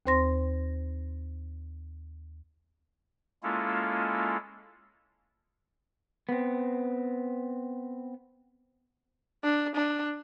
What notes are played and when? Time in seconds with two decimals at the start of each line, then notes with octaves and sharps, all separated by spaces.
0.06 D#2 C4 C5 C6 A#6
3.43 G#3 A#3 C#4 E4 F4 A4
6.29 B3 C4
9.43 D4
9.75 D4